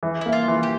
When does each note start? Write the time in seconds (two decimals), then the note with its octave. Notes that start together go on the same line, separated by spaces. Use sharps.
0.03 E3
0.21 A#3 E4
0.32 F4
0.48 E3
0.63 G4